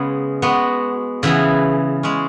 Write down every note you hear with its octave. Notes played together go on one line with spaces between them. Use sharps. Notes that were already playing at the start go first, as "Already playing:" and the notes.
Already playing: C#3 G#3 B3
G#3 B3 F#4
C#3 E3 B3 E4 G#4
C#3 G#3 C#4